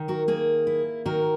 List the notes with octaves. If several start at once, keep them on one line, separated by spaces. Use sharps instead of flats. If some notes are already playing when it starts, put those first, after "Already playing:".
Already playing: D#3
F#4 A#4
A#3 G#4
E4
D#3 F#4 A#4